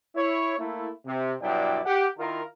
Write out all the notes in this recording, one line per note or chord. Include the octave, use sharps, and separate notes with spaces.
E4 C#5
A3 A#3 E4
C3
G2 B2 F#3 E4 D5 G5
G4 F#5
D#3 E4 F4 A#4